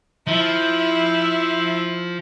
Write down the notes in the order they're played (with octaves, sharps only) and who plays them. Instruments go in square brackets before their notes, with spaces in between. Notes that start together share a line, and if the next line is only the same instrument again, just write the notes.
[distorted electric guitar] F3 [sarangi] E4